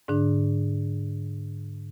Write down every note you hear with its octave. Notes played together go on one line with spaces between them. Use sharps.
G#2 D3 D4